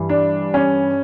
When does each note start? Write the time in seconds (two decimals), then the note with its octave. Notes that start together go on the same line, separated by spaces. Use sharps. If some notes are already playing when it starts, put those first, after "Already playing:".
Already playing: G2 E3
0.09 D4
0.54 C#4